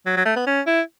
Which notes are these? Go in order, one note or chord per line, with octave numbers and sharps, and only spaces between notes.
F#3
F#3
A3
B3
C#4
E4